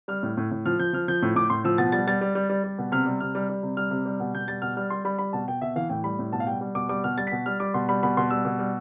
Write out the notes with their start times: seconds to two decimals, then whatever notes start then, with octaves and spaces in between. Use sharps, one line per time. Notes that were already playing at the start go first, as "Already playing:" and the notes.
0.08 G3 F6
0.23 A2
0.37 A2
0.51 A2
0.66 F3 F6
0.79 F3 G6
0.93 F3 F6
1.08 F3 G6
1.22 A2
1.36 A2 D6
1.50 A2 C6
1.64 F3 E6
1.78 B2 A6
1.92 G3 A6
2.07 G3 A6
2.21 G3
2.35 G3
2.49 G3
2.64 G3
2.78 B2
2.92 C3 F6
3.06 G3
3.20 C3 F6
3.35 G3
3.49 G3
3.63 C3
3.77 G3 F6
3.91 C3
4.06 G3
4.20 B2
4.34 B2 G6
4.48 G3 A6
4.62 B2 F6
4.77 G3 F6
4.90 G3 C6
5.05 G3 B5
5.18 G3 B5
5.33 B2 A5
5.48 B2 G5
5.61 B2 E5
5.76 E3 F5
5.90 A2 G5
6.04 G3 B5
6.19 A2
6.32 B2 A5
6.40 F5
6.47 G3 G5
6.61 G3
6.75 B2 D6
6.89 G3 D6
7.04 B2 F6
7.17 G3 A6
7.27 B6
7.32 B2
7.46 G3 F6
7.60 G3 D6
7.74 B2 C6
7.89 G3 B5
8.03 B2 B5
8.17 B2 C6
8.30 G3 E6
8.45 B2
8.59 G3